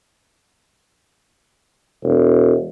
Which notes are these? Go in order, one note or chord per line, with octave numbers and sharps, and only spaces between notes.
E1